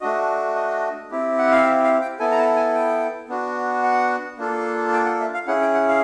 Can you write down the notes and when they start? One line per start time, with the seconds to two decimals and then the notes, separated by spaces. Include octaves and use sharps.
0.01 A3 D4 F#4 D#5
0.55 D#5
1.11 C4 E4 G4
1.38 F#5
1.52 F5
1.65 E5
1.83 F5
2.01 G5
2.19 B3 E4 A4 G#5
2.31 A#5
2.38 A5
2.56 G#5
2.74 G5
3.29 B3 D4 F#4
3.83 F#5
4.38 A#3 D4 F4 A4
4.93 G5
5.06 F#5
5.20 E5
5.34 F5
5.47 C#4 E4 G#4 F#5
5.61 G5
5.74 F#5
5.88 F5